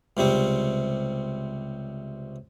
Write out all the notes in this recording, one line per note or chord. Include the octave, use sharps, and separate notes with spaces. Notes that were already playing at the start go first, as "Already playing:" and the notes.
C#2 C3 G3 C4